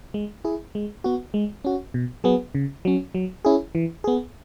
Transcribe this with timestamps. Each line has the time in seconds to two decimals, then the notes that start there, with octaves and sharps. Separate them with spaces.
0.14 G#3
0.45 E4 G#4
0.75 G#3
1.04 B3 F#4
1.34 G#3
1.65 C#4 F#4
1.94 B2
2.24 F#3 B3 G#4
2.55 C#3
2.85 F#3 C#4
3.15 F#3
3.45 C#4 E4 G#4
3.75 E3
4.04 B3 G#4